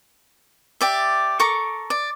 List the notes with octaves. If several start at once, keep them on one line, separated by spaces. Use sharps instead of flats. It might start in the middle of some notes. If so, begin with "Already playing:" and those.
G4 D5 E5
A4 A#4 C#6 D6
D5